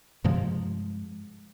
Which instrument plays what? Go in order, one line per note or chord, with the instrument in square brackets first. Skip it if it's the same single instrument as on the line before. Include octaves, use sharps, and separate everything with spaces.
[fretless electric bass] G2 C3 F3 G#3